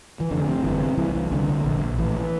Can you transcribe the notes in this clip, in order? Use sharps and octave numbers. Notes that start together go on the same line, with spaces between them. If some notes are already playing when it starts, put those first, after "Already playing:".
E3
F1 D3
C3
G1 E3
C3
C2 E3
C2 E3
C2 D3
C2
A#1
A#1
A1 E3